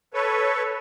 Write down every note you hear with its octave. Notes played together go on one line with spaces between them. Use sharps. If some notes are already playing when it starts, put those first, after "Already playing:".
A4 B4 C#5